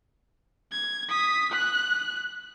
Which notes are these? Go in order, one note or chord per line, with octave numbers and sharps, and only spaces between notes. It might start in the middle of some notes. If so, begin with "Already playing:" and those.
G#6
D#6 B6
F#6